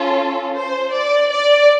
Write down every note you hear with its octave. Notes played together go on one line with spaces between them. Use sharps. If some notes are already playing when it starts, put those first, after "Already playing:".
Already playing: C#4 F4 A4
C5
D5
D5